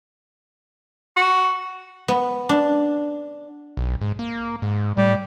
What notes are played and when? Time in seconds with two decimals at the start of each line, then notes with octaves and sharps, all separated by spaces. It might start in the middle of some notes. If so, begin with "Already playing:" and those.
1.17 F#4
2.08 B3
2.49 D4
3.77 B1
4.01 G#2
4.19 A#3
4.62 G#2
4.97 A2 G3